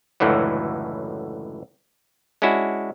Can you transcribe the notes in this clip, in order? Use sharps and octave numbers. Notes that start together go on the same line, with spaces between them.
C#2 F#2 A2 D3 E3 F#3
G#3 C#4 D4 E4 F#4